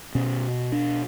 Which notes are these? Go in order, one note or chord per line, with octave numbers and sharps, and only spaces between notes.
B2 C#4
D4